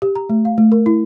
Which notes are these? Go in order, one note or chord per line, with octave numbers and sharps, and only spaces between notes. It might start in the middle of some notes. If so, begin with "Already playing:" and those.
G4
A#5
A3
F5
A3
A#4
E4